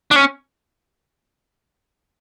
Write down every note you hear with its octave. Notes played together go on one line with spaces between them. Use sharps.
D4
C#4